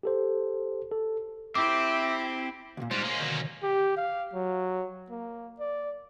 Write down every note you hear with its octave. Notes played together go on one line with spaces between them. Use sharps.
G4 A4 C5
A4
C4 E4 G4 E5 D6
D2 A#2
G#2 G3 C5 F6 F#6 A#6
G#3 A#3 C#4
B2 D3 D#3 F#3
G4
F5
F#3
A#3
D5